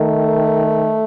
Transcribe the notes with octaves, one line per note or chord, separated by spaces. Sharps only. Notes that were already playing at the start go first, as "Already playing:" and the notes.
Already playing: D#3 A3